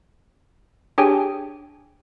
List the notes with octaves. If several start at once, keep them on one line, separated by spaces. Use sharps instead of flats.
D4 G4 G#4 C#5 G5 G#5